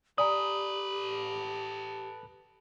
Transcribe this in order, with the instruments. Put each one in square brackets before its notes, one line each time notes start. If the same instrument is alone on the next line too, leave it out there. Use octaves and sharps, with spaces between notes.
[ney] G4 [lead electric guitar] A4 B4 [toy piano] D5 G#5 A#5 [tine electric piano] D#6